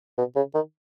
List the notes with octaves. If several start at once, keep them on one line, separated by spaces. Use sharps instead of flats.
B2
C#3
D#3